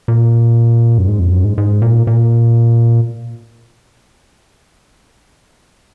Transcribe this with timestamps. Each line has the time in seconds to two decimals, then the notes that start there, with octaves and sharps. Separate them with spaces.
0.08 A#2
0.98 F#2
1.08 G#2
1.19 F2
1.32 F#2
1.45 G#2
1.58 G#2
1.82 A#2
2.07 A#2